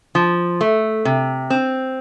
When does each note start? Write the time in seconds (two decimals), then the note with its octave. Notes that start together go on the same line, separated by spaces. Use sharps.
0.15 F3
0.61 A3
1.05 C3
1.50 C4